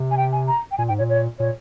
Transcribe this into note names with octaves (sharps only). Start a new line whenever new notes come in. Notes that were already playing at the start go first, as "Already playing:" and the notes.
Already playing: C3
G#5
G5
G#5
A#5
G5
A#2 G#5
G#2 G5
A#2 C#5
C#5
A#2 C#5